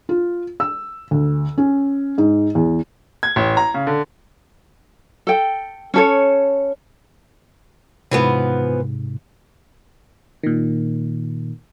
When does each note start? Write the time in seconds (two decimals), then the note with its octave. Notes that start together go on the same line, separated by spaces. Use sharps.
0.09 F4
0.60 E6
1.11 D2
1.58 C#4
2.18 G#2
2.55 E2
3.23 G#6
3.36 A1
3.57 A#5
3.74 C#3
3.87 D3
5.27 A4 G5
5.94 C#4 A4 C#5
8.11 G#2 C3 E3 F3 B3
10.43 A#2 D#3